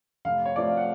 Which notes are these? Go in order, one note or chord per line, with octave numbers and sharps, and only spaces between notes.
F1 F5
C#5
F2 F3 A3 D5
F5
F#5